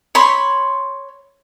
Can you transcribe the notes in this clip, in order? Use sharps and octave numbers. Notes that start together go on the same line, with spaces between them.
C#5 B5 C6